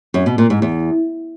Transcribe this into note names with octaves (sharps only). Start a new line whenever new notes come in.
F#2
B2
A#2
G#2
E2